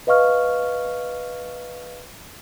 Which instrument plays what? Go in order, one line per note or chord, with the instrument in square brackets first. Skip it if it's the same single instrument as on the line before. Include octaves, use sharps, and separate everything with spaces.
[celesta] B4 D#5 F5 C#6 F6